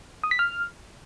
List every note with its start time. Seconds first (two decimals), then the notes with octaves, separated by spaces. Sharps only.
0.24 D#6
0.31 B6
0.39 F6